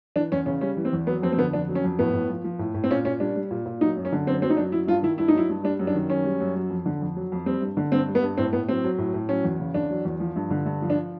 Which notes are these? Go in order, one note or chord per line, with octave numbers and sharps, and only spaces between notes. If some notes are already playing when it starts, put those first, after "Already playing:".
E3 D4
E2 C#4
C#3 C#4
G3 C#4
E3
C4
E2
F#3 B3
F2 C4
C4
D3 B3
F2 D4
F#3
C#4
F2
A2 B3
A2
F3
F3
A2
A2
C4
A#2 C#4
A#2 C#4
G3 D4
G3
A#2
A#2
F#3 D#4
F#2
C#4
D3
F#2 C4
F#3 C4
D#4
F#2 D4
F#3 E4
G2 F4
D#3 E4
G2 E4
D#4
F#3 E4
G2
G3 D4
F#2
D4
D#3
F#2 C#4
G3
F#2
F#3
F2
D3
F2
F#3
F2
G3 C4
G2
D3
G2 C4
G3
B3
G2
A2 C4
A2 B3
F#3 C4
F#3
A2
A2
F#3 C#4
E2
C#3
E2 D4
F#3
E2
F3
G2
D3
G2
F3
D4